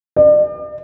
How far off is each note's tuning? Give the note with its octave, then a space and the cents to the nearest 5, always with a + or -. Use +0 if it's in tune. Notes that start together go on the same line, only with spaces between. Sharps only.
D5 +40